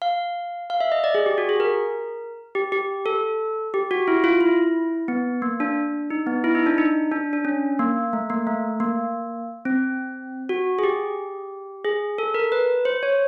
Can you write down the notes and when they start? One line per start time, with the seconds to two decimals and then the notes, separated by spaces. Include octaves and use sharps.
0.02 F5
0.70 F5
0.80 E5
0.92 D#5
1.04 D5
1.15 G#4
1.26 G4
1.38 F#4
1.49 G#4
1.60 A#4
2.55 G4
2.72 G4
3.06 A4
3.74 G4
3.91 F#4
4.08 E4
4.24 F4
4.41 E4
5.08 B3
5.42 A#3
5.60 D4
6.10 D#4
6.27 B3
6.44 E4
6.55 D#4
6.66 D4
6.78 D#4
7.12 D4
7.33 D4
7.45 C#4
7.79 A#3
8.13 A3
8.30 A#3
8.47 A3
8.80 A#3
9.65 C4
10.49 F#4
10.79 G#4
10.84 G4
11.85 G#4
12.18 A4
12.34 A#4
12.52 B4
12.85 C5
13.03 C#5